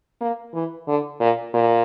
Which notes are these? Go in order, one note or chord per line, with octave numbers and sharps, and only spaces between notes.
A#3
E3
D3
A#2
A#2